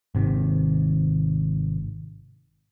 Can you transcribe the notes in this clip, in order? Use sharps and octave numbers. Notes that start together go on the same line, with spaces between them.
G#1 C3 D#3